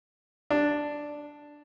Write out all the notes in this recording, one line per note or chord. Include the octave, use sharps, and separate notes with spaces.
D4